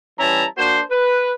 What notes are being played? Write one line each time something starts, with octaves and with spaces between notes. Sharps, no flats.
E3 G3 C#4 E4 A5 A#5
A#3 D4 F#4 C5
B4